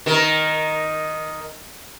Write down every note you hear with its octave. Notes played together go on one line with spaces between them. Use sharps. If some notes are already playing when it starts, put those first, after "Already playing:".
D#3 A#4